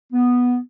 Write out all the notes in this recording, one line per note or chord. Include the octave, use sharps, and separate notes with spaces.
B3